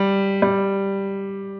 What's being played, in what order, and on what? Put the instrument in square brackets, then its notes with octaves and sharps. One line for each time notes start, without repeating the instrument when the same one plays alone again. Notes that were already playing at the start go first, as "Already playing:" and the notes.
Already playing: [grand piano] G3
G3